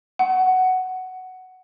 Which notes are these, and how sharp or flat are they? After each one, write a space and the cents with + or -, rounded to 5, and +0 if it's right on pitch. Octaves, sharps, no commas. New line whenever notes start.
F#5 +5